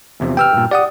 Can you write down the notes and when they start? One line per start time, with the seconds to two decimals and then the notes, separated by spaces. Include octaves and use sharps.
0.20 E2 C3 F3
0.37 G4 B4 G5 E6 F6
0.53 G2 A#2
0.71 G4 D5 F#5 D#6